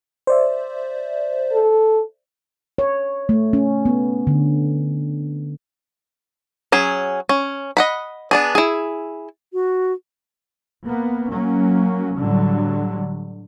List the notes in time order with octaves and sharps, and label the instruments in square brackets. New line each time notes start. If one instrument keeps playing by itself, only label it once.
[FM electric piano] C5 D5 E5
[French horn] A4
[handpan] C#5
A3
C#4
B3
D3
[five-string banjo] F#3 C#4 G#4
C#4
D#5 F#5 B5
B3 D4 G#4
E4 G#4
[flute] F#4
[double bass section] A#3 B3
F#3 A#3 C#4
A2 D3 F#3 G3